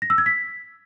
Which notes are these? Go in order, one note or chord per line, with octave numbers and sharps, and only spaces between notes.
A#6
E6
G#6
B6